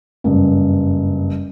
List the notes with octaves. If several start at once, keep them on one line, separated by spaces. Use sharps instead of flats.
F#1 G2